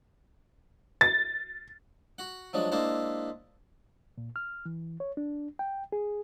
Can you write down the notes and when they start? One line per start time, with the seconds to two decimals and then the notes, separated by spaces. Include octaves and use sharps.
1.01 A6
2.18 F#4 F#5
2.53 F3 F#3 G#3 D4
2.72 G#3 A#3 D4 E4 C5 E5
4.18 A#2
4.36 F6
4.66 E3
5.00 C#5
5.17 D4
5.59 G5
5.92 G#4